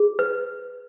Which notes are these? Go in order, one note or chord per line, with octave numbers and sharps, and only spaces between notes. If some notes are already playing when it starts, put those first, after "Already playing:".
Already playing: G#4
B4